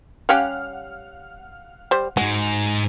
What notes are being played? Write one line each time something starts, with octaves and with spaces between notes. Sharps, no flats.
G3 C#4 G4 F5 F#5 F6
G3 C5
G#2 G#3 F#4